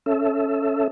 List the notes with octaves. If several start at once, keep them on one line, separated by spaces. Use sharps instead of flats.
C#4 A4 E5